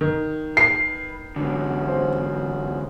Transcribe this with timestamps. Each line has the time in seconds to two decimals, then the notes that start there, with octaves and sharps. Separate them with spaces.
0.01 D#3
0.57 B4 C7
1.36 G#2 D3 B3 C#4 F#4
1.88 C5